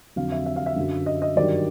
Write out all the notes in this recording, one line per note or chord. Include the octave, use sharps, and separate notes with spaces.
F2 D3 F#3 F5
E5
E5
F5
E5
F#2 D3 F#3
D#5
D#5
G2 D#3 F#3 D5